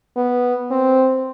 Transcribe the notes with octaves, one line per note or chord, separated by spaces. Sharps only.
B3
C4